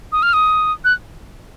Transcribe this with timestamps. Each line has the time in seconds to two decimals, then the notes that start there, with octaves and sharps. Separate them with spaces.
0.12 D#6
0.23 F6
0.33 D#6
0.85 F#6